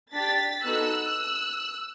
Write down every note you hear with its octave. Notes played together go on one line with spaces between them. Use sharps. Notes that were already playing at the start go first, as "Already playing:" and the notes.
D4 G4 A6 B6
B3 D#4 F#4 A4 E6 F#6